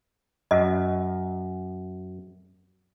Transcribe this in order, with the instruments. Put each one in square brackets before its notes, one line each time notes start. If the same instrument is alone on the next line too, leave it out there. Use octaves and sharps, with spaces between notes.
[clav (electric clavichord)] F#2 [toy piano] D#5